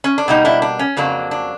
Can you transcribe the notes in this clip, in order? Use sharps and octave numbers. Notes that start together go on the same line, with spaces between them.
C#4
D4
B2 G3 A#3 D#4
D4 E4
D4
C#4
F2 C#3 F#3 A#3 D4
D4